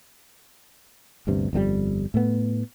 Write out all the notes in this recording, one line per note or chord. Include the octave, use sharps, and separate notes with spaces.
G1 D2 G2 C3
G1 F2 D3 G3
A2 A3 B3